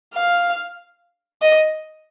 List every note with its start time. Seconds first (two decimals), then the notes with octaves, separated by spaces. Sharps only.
0.15 F5
1.42 D#5